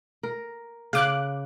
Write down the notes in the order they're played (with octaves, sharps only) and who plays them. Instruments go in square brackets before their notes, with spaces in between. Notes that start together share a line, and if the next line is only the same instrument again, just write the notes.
[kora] A#4
[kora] C#3 [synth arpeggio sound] F5 D6 F#6